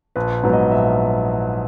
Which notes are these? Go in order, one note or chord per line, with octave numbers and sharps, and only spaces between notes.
A#1 B4
G#2 F#3 B3
D#5
A#1 E5